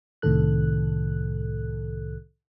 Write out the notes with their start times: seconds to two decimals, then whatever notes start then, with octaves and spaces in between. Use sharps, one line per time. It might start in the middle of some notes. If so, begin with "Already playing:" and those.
0.22 C2 A2 C3 D#3 A4 F#6